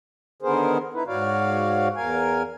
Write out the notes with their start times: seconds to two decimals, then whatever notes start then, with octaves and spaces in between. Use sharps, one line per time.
0.42 D3 D#3 B3 G#4 A#4 C5
0.94 D#4 E4 B4
1.07 G#2 F#4 C#5 D5 F5
1.96 E2 A#4 F5 G#5